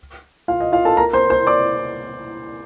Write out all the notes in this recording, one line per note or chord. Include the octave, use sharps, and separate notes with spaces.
F4 F5
D#5
F4 F5
A4 A5
A#4 A#5
C5 C6
C5 C6
D5 D6